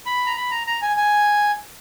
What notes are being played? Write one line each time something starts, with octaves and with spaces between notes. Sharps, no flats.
B5
A#5
B5
A#5
A#5
G#5
G#5